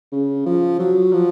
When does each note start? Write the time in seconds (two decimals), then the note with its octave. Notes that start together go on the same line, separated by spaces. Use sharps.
0.12 C#3
0.46 F3
0.79 F#3
1.13 F3